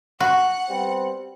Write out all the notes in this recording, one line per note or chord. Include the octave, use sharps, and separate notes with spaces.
F#4 F#5
G3 B3 C4